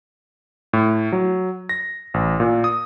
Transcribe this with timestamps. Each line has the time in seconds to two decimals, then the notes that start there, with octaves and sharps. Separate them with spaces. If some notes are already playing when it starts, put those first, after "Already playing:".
0.73 A2
1.12 F#3
1.69 A#6
2.14 A1
2.40 A#2
2.64 D#6